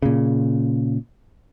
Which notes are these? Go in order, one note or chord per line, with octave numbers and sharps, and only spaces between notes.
A#2 C#3